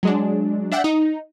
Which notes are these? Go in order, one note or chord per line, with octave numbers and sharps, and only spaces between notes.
F#3 G#3 D4
D4 E5 F#5 G5
D#4